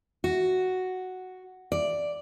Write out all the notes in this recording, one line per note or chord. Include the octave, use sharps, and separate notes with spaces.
F#4
D5